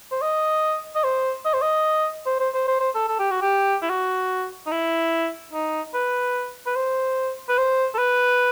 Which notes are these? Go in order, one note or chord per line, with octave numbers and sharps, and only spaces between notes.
C5
D#5
D#5
C5
D#5
C5
D#5
C5
C5
C5
C5
C5
A4
A4
G4
F#4
G4
E4
F#4
D#4
E4
D#4
B4
B4
C5
B4
C5
A4
B4